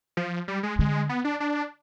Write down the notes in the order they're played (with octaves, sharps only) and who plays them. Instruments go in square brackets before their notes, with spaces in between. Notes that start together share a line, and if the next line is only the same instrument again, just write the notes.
[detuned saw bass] F3
G3
G#3
[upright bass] D3 [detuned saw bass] G#3
[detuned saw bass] B3
D4
D4